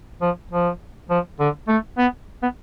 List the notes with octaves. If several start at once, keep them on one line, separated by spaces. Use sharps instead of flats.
F3
F3
F3
D3
A3
B3
B3